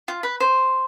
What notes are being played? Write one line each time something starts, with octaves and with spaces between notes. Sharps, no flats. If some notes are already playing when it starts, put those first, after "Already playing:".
F4
B4
C5